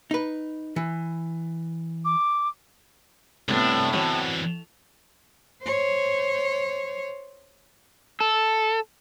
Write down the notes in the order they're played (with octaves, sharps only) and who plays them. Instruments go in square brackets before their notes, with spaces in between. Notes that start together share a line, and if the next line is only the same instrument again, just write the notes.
[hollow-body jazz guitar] D#4 B4
E3
[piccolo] D6
[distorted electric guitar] C2 D4 [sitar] A2 [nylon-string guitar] C3 A3 B3
[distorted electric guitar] D3 E3 [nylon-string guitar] C4 F#4 C#5
[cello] C5 C#5
[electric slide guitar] A4